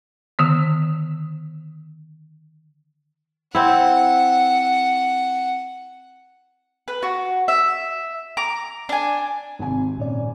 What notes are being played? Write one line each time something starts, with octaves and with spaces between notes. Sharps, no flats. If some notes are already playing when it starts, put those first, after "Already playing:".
D3 D#3 B3
C4 E4 F#5
B4
F#4
E5
A#5 D6
D4 G#5
G#1 C3 G#5
A#2 C#4 D5